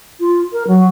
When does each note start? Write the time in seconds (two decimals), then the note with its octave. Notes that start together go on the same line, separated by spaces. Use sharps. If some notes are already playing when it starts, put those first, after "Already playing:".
0.21 F4
0.53 A#4
0.68 F#3